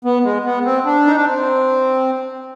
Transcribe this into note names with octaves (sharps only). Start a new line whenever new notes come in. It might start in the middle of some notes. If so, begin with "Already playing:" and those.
B3
G#3
B3
C4
D4
D#4
D4
C4